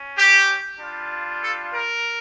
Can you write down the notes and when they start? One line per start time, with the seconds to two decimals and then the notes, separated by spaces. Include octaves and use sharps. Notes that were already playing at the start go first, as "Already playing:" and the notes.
Already playing: C#4
0.16 G4
0.80 G3 D4 F4
1.42 A4
1.74 A#4